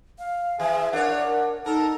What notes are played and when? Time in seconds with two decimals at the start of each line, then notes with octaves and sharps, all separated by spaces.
0.19 F5
0.59 E3 G#4 E5
0.93 D4 A#4 C#5 F#5
1.66 D#4 A4 A#4